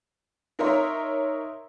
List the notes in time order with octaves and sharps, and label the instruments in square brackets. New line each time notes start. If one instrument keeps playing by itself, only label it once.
[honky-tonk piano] D#4 A#4 C#5 E5 A#5 C6